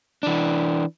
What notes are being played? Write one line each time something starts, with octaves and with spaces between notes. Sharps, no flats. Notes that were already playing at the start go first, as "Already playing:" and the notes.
E3 D4